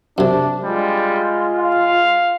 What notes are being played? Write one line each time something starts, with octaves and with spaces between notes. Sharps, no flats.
F#2 C3 D4
G3 G#3 F4
F5